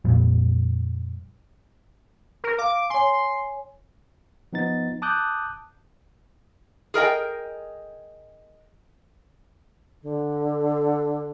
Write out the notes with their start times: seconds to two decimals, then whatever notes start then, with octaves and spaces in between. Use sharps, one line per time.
0.05 F2 A#2 G3
2.44 A#4
2.58 F5 D6
2.90 C#5 G#5 C6
4.53 F3 B3 D#4 A6
5.02 A5 D6 D#6 F#6 G6
6.94 G#4 A#4 D#5 G5
10.02 D3